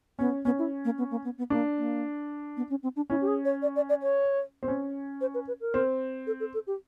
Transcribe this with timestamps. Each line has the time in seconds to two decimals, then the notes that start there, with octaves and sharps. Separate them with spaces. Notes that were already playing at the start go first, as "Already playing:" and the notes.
0.19 B3 C#4
0.45 B3 C#4
0.59 E4
0.85 A#3
0.98 B3
1.11 A#3
1.25 B3
1.38 B3
1.50 A#3 D4
1.78 A#3
2.57 B3
2.70 C#4
2.83 C4
2.96 D4
3.10 C#4 E4
3.21 G4
3.27 G#4
3.45 C#5
3.62 D5
3.76 D5
3.89 D5
4.02 C#5
4.63 C4
4.68 C#4
5.21 C5
5.34 B4
5.48 B4
5.61 A#4
5.74 C4
6.27 A4
6.40 A4
6.54 A4
6.67 G4